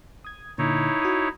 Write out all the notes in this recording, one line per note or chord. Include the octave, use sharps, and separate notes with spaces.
D#6 G#6
A#2 D3 D#4 E4 C#5
F#4 D#6